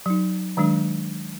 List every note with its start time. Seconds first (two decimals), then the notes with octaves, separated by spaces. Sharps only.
0.06 F#3 D#4
0.57 D#3 F#3 G#3 D4